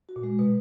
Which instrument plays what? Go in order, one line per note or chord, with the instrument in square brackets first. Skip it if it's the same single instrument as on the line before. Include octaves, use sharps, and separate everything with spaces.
[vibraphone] F#4
[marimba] A#2
[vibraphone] G#3
[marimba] B2 [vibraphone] B4